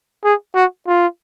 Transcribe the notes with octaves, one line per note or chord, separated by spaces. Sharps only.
G#4
F#4
F4